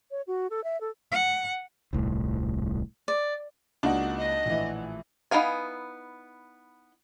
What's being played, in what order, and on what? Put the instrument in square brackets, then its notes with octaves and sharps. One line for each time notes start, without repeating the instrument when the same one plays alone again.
[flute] C#5
F#4
A4
E5
A4
[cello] F#5
[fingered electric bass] D#1 C2 A2
[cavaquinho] D5
[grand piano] C#2 A#3 [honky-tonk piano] D4 D#4 F#4
[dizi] D#5
[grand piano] A#1 A2 E3
[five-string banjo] B3 D#4 E4 F5 G#5